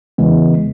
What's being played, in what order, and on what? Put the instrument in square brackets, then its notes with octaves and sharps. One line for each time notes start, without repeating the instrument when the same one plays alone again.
[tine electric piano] E2 C#3 E3 G#3 B3